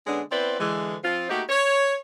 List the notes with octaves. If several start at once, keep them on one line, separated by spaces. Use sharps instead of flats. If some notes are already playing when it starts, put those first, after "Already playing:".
D3 G#3 B3 C#4 D4
B3 C4 E4 B4 C5 D5
D3 E3 G#3
F3 C4 F4
A3 A#3 D#4 F#4 G4
C#5